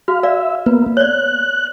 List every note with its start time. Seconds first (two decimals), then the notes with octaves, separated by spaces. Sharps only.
0.08 F#4 F5
0.23 D5 E5 F5
0.66 A#3 B3 B4
0.97 C#5 D5 F#6